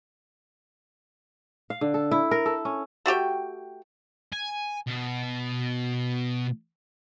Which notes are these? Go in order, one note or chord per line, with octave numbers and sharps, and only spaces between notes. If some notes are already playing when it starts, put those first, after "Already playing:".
F5
D3
A4
E4
A#4
A4
C#4
A3 F#4 G4 G5
G#5
B2